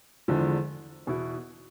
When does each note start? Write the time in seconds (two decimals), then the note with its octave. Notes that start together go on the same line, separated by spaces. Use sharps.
0.28 E2 D3 F3 G#3
1.07 E2 B2 B3 E4